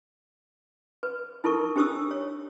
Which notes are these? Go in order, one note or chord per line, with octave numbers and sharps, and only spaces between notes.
B4
D#4 E4 A4 A#4 C#6
D4 G4 C5 C#6 D#6 E6
C#5